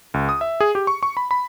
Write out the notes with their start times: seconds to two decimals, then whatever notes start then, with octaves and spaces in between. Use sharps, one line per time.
0.14 C#2
0.29 D#6
0.41 E5
0.61 G#4
0.75 G4
0.87 C#6
1.03 C#6
1.17 B5
1.31 B5